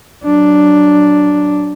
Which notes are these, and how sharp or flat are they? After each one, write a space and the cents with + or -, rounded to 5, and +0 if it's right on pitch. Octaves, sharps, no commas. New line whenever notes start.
F#3 +15 D4 +0